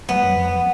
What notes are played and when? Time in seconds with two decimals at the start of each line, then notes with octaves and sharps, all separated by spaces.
0.09 F#3 B3
0.16 G3
0.23 F#2 F#3
0.36 F2 F3